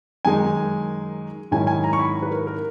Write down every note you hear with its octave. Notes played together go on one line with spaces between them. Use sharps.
F#2 D#3 G#3 D#4 G#5
G#2 D#3 F#3 C#4 E4 G#5
G#5
A#5
C#6
B5
B4
A#4
A#4